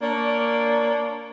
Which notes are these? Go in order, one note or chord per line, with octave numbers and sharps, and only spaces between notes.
A#3 D4 C#5 D5